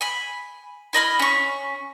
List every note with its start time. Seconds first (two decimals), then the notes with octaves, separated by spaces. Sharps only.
0.01 G#5 B5
0.93 E4 D#5 B5 F6
1.19 C#4 C#6